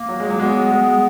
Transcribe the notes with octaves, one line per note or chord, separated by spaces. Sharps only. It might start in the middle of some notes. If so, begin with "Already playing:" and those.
Already playing: A#3
F#3
G#3
F#3
G#3 B3
G#3